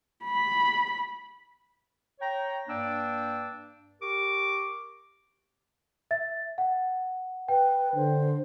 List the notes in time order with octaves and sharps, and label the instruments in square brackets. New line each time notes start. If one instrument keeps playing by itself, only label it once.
[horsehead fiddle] B5
[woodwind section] C#5 G5 A#5
G2 A#3 D4 D5 G5 E6
G4 A#4 C#6 D6
[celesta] E5 A6
F#5
[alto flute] B4 [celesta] G5
[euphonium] D3 [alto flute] C5